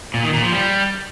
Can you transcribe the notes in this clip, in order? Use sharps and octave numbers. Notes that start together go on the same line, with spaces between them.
A#2
D#3
A#2
F3
G3